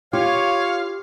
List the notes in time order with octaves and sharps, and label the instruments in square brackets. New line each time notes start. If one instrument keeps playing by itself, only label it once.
[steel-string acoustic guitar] F4 [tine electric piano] G4 [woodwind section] C#5 [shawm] F5